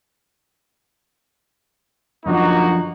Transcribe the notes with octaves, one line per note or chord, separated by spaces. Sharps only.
F#2 D3 F3 A#3 D#4 F#4